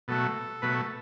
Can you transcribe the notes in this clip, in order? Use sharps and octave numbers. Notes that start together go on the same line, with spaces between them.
B2 F#3 A3 A4
B2 F#3 A3 B4
A4